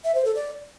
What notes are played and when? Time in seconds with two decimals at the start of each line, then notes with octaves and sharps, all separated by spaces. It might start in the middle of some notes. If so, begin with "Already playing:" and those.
0.04 E5
0.15 C5
0.25 A4
0.35 D5